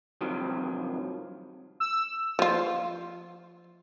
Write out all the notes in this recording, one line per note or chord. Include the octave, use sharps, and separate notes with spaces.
G2 C3 D#3 F3 F#3
E6
F3 F4